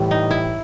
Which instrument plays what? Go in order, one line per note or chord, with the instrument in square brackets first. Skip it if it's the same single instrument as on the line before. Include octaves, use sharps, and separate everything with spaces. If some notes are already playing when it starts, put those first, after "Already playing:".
Already playing: [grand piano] A2 E3 G3
[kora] D#4
E4